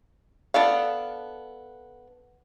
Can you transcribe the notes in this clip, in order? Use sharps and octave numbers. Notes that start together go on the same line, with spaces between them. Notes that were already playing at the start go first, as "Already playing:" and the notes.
B3 D4 A4 F5